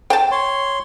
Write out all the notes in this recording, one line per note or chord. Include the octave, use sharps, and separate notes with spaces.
G5 A5
C#5 C6